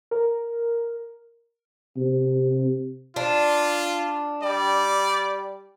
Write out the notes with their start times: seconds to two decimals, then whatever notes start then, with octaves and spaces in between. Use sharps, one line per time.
0.11 A#4
1.97 C3
3.16 D4 F4
4.42 G3 D5